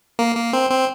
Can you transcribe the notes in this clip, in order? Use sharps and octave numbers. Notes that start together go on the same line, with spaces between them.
A#3
A#3
C4
C4